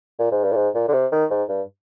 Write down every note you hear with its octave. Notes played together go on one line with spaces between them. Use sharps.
A#2
G#2
G2
A#2
G#2
A#2
D3
C3
D#3
G#2
G2